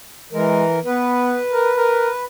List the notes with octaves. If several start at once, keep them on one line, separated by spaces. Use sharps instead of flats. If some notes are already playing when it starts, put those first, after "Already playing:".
E3 G#3 A#4
B3 B4
A#4
A#4